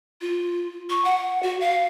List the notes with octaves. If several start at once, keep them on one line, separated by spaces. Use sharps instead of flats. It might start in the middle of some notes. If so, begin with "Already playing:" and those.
F4
C#6
F#5
F#4
F5